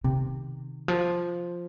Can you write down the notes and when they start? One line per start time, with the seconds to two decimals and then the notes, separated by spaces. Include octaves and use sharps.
0.04 C3 D#3
0.88 F3